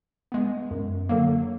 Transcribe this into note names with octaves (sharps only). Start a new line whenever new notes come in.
G#3 B3
F#2
D3 F#3 A#3